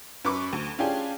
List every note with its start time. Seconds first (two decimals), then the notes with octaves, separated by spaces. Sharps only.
0.25 F#2 B4 C#6 D6
0.53 D2
0.79 C#4 D4 F4 G4 G#4